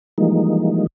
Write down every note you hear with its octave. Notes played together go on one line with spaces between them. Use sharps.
E3 F3 G3 G#3 A#3 D#4